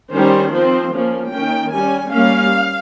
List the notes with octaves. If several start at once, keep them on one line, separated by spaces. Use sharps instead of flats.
D#3 G3 C#4 C5
F3 C4 C5
F3 A#3 C#4
D#3 A#3 C#4 G5
G3 C#4 G#5
G3 A#3 C#4 F5